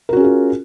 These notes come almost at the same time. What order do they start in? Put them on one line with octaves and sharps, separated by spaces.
A#4 F#4 C#4 G#4 F4